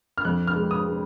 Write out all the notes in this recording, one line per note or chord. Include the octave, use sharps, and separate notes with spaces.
F6
F2 F#6
F6
G#3
D#6
G#3